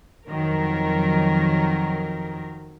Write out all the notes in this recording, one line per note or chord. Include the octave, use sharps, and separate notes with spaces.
F2 D#3 F#3 A#4